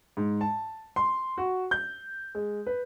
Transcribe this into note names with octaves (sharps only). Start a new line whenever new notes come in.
G#2
A5
C6
F#4
G6
G#3
B4